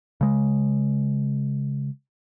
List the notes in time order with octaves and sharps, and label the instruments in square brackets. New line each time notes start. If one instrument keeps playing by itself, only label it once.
[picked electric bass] C#3 G#3